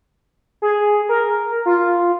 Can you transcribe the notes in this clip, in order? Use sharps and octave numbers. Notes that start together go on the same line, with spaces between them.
G#4
A#4
F4